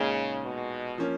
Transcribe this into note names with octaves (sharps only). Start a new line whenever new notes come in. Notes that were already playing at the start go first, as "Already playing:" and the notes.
Already playing: A#2 C#3 G#3 D#4
B2
F3 A#3 C#4